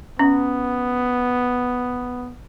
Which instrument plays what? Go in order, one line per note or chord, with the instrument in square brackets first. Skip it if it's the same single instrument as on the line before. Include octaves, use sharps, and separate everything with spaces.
[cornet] B3 [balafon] C#4